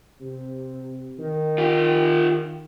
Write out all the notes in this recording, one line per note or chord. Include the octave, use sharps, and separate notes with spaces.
C3
D#3
F4 G4